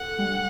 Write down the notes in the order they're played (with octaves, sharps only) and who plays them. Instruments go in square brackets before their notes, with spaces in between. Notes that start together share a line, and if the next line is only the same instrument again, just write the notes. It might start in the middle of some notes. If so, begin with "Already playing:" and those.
Already playing: [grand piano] A4 [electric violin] F#5
[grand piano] G3